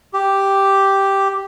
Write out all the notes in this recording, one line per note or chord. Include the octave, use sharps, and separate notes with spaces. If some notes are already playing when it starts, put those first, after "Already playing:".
G4